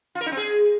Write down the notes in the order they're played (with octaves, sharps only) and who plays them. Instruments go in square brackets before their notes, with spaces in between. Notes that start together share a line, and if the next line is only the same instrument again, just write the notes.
[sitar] F4
A#4
D#4
C4
G#4